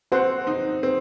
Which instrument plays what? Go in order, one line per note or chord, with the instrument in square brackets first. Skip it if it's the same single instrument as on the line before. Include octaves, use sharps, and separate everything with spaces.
[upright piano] C4 [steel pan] F#4 C5 F#5 C6
[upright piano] D#4
C4